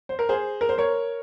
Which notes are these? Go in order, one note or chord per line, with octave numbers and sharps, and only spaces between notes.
C5
A#4
G#4 C5
A#4
C5
A#4 C#5